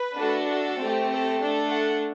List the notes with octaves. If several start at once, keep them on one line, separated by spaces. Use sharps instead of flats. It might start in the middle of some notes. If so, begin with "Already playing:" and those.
Already playing: B4
A3 D4 F#4 A4
A4
A3 C4 G4
A4
A3 D4 A4
F#5